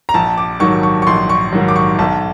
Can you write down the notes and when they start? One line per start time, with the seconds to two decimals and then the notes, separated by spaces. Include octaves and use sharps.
0.09 A#5
0.14 A#1 A5
0.38 D6
0.60 G#2 D#3 F#3 C#6
0.83 C#6
1.02 C#6
1.07 A#1 C6
1.29 C#6
1.53 G#2 D#3 F#3
1.68 D6
1.76 C#6
1.99 B1 A5